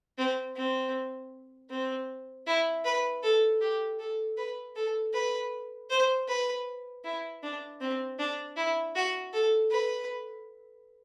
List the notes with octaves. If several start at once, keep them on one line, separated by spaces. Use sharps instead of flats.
C4
C4
C4
E4
B4
A4
G4
A4
B4
A4
B4
C5
B4
E4
D4
C4
D4
E4
F#4
A4
B4